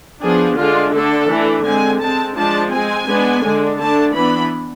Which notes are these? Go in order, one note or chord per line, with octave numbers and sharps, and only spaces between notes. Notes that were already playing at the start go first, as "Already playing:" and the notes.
F3 B3 D4 G#4
D3 G#3 D4 F4
D3 A3 D4 A4
E3 A3 D4
D3 G#3 C4 G#5
G#3 C4 A5
F3 G#3 D4 A5
G#3 C4 G#5
G#3 B3 D4
D3 G#3 D4
D3 A3 D4 A5
E3 B3 D4 B5